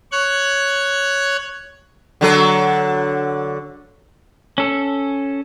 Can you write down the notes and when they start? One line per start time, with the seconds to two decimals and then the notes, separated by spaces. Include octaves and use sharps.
0.12 C#5 F#6 G#6
2.21 D3 F#3 A4
4.58 C#4 A4